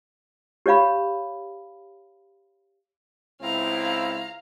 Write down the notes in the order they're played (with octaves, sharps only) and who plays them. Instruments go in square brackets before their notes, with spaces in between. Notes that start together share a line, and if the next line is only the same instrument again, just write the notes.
[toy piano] G4 C#5 D5 F5 B5
[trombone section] C#2 C4 E4 [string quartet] F5 A#5